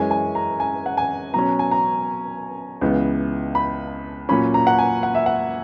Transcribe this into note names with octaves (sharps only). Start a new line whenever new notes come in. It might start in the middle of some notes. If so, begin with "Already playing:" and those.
Already playing: F#2 E3 G#3 C#4 G#5
G#5
A#5
G#5
F#5
G#5
B2 F#3 C#4 A#5
G#5
A#5
C#2 C#3 E3 B3
B5
A#2 F#3 C#4 B5
A#5
F#5
G#5
F#5
E5
F#5